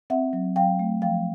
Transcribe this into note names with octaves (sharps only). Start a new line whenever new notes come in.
C4 E5 F#5
F#3
F#3 F5 G5
A3
F3 F5 G5